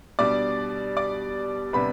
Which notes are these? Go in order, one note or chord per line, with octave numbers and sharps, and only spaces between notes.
B2 G3 D4 D5 D6
D5 D6
C3 G3 B3 D4 B4 B5